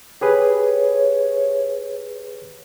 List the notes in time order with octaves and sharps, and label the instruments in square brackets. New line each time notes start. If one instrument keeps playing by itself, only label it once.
[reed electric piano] G4 G#4 B4 [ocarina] C#5